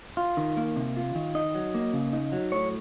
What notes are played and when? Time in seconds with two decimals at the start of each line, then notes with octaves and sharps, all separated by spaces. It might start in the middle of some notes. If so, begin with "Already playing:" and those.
0.17 F4
0.37 D#3
0.57 A#3
0.76 C3
0.96 F4
1.15 D#3
1.35 D#4 D#5
1.54 F#3
1.75 A#3
1.93 C#3
2.13 D#4
2.32 F#3
2.52 A2 C#5